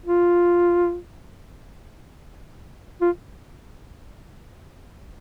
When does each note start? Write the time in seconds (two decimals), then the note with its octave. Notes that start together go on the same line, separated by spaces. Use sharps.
0.06 F4
3.01 F4